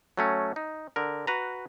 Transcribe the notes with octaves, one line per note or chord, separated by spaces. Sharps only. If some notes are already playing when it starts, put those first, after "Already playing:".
F#3 A3 C#4
D#4
D3 A#4
F#4 B4 A#5